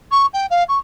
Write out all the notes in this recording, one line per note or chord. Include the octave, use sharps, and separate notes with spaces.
C#6
G5
F5
C#6